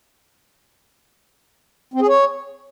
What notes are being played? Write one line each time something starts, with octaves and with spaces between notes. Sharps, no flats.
C4
G#4
C#5